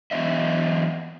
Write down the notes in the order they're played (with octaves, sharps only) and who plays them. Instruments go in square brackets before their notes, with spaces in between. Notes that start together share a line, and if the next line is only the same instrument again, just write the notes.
[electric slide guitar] E3 F#3 B3 D#5 E5